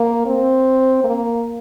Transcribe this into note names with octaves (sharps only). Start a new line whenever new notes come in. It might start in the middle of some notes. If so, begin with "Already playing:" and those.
Already playing: A#3
C4
A#3